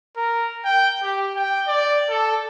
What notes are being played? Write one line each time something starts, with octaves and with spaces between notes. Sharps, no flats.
A#4
G5
G4
G5
D5
A4